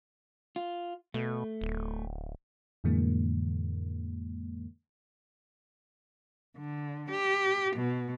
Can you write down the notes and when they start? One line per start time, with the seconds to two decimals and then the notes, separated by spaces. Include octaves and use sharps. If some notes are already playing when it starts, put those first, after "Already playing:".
0.56 F4
1.14 B2 A3
1.61 D1
2.84 F2 A2 D3 E3 G#3 A#3
6.57 D3
7.11 G4
7.76 B2